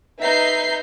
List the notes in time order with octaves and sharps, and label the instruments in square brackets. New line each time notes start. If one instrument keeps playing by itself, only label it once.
[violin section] D#4 B4 E5 A#5 G6 C7